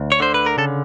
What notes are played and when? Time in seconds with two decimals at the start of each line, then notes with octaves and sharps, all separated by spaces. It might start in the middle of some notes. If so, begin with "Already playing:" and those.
Already playing: D2
0.12 C#5
0.20 D3 C5
0.34 B4
0.46 A#4
0.58 C#3 A4